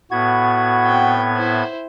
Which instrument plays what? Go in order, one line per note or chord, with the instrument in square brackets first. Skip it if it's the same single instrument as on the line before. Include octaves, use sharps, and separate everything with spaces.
[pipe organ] A2 B3 G#6 [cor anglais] F#4
[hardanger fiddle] C4 G5
E4 C5